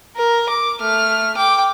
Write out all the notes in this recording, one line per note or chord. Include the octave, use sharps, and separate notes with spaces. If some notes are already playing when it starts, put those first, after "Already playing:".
A#4
D6
A3 F6
G5 D6